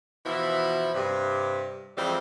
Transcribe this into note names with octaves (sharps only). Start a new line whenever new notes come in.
B2 E3 F3 E4
G2 C3
F2 E3 G3 G#3 C4